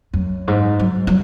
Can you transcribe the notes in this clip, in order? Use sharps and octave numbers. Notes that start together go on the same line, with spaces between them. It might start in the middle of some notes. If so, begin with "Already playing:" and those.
F#2
G#2
F#3
F#3